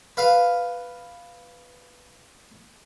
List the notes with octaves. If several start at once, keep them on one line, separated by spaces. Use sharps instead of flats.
B4 F5